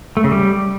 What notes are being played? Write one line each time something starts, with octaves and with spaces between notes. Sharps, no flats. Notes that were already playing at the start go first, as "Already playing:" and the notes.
A3
C#3
G3